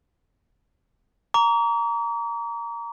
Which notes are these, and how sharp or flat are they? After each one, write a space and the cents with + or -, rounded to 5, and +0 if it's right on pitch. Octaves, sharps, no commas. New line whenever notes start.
A#5 +0 D6 -45